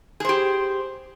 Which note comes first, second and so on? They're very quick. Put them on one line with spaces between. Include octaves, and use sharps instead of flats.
G#4 C5 G4